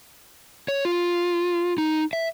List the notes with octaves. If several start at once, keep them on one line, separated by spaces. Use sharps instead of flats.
C#5
F4
D#4
E5